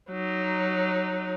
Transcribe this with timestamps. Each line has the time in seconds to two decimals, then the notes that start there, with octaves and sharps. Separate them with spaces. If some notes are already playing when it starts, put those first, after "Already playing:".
0.11 F#3 D#4